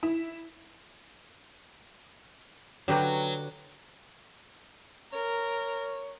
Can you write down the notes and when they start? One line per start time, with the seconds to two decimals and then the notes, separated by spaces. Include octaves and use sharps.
0.03 E4
2.88 D3 F#3 G4 B4
5.13 A#4 C#5